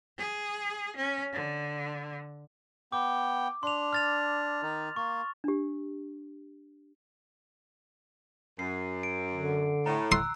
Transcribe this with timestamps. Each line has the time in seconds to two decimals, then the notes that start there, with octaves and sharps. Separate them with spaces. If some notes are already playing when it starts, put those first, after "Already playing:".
0.18 G#4
0.97 C#4
1.33 D3
2.92 B3 G5 D6
3.63 D4 C6 F7
3.93 F6 A6 F7
4.63 D#3 D#4
4.96 A#3 C#6
5.44 D4 G4
8.59 F#2 C7
9.03 D7
9.34 D3
9.86 A2 A#5
10.12 C6 E6 F#6